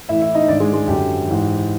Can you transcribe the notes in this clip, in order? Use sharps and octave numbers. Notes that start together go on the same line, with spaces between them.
A2 E3 E4 E5
E4 E5
D#4 D#5
G#2 D#3 D4 D5
G#3 G#4
G#3 G#4
F#2 D3 G4
G#2 E3